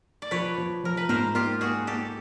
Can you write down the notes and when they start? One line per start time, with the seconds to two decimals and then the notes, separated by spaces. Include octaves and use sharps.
0.22 D5
0.31 F3 B4 C#5
0.58 F3
0.84 F3 A#4
0.97 B4
1.09 G#2 A#4 C5
1.35 A#3 F4 G4
1.61 A#3 F#4 G#4
1.87 A#3 G4 A4